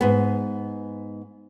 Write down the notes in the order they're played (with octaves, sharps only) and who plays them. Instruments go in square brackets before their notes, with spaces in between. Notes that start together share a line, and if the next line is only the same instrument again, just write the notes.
[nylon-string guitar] G#2 B3